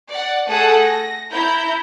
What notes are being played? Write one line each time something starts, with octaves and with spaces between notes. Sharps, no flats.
D5 F#5
A3 G#4 A4 F#5 A5 D#6
A#6
E4 A#5 G6